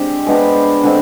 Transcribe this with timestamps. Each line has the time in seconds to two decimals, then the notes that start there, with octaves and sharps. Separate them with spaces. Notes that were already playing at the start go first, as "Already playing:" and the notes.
Already playing: G#3 C4 D4 G4
0.27 G#3 B3 D4 G4
0.83 D3 G#3 C4